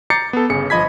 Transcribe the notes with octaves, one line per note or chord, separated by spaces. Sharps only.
A#5 D6 G6 A6 C7 C#7
B3 A4
G1 C#3 G#4 C#7
G1 F3 D#5 B5 G#6 B6